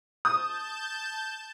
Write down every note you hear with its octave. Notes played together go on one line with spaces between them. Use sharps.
A5 D#6 G6